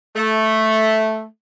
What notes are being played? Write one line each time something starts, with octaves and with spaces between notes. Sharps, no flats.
A3